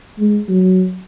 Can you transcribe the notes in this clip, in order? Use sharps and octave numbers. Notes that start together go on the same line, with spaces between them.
G#3
F#3